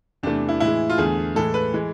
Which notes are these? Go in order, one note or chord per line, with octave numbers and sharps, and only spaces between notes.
E2 C3 E3 A3 D4
E4
A2 E3 G#3 E4
F4
E2 D3 A3 G#4
A2 E3 G#3 A4
B4
E3 G#3